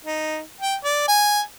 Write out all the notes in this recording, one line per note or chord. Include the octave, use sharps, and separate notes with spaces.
D#4
G5
D5
G#5